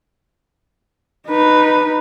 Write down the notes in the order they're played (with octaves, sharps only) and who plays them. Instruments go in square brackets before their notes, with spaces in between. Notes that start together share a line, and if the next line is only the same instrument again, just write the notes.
[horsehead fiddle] D#4 B4